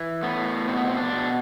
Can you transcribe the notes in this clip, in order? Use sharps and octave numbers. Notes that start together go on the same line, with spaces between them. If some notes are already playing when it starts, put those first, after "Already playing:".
Already playing: E3
A2 B3
B2 C4
B3
C4
D4
B2